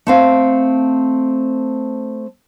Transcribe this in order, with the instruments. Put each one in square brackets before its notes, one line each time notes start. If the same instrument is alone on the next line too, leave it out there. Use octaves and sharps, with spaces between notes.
[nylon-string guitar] A3 C4 F5